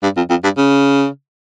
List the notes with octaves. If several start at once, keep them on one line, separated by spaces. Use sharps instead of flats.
G2
F2
F2
G2
C#3